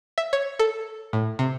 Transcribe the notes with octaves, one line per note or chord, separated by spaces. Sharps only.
E5
C#5
A4
A2
C3